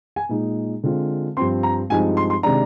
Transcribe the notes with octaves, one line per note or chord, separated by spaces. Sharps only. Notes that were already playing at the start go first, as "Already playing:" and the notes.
G#5
A#2 G#3 D#4
D3 G#3 C4 F4
G2 F3 C4 C6
A#5
G2 F3 G#3 C4 D#4 G#5
C6
C6
C3 D#3 G#3 D4 A#5